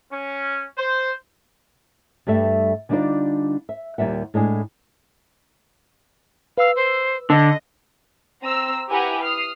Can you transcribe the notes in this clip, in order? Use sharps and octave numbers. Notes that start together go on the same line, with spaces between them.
C#4
C5
G2 G3 A3 E5
D3 G3 D4 D#4 F4 D5
E5
D#2 A#2 G3 E5 F#5
A2 G#3 D4 G#4
B4 F5 E6
C5
D3 D#5 A5
C4 A#5 E6
E4 G4 B4 F#5 G#5 A#5
D#6 F6 C7